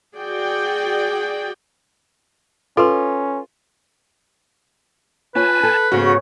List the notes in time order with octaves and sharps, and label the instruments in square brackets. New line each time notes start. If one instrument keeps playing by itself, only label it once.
[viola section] F#4 G#4 D5 G5
[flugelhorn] C#4 [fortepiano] F4 [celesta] A4 B4 C6
[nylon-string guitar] C#4 F4 C#5 [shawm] B4 [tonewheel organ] G#5 A5
[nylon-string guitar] A4
[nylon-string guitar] G#2 B3 [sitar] C#3 [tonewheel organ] F#4